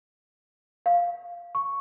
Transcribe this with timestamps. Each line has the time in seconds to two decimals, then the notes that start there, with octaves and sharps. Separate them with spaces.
0.86 F5
1.55 C#6